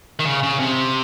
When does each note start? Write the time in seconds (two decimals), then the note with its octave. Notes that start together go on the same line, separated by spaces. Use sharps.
0.20 D#3
0.25 C#3
0.43 C#3
0.60 C3